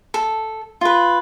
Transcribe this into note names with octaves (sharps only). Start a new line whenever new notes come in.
A4
F4 B4